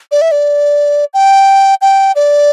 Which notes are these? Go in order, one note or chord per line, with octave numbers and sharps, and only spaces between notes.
D5
E5
D5
G5
G5
D5